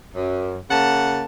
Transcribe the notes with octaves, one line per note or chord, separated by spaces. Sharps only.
F#2
C#3 A#3 F#5 A5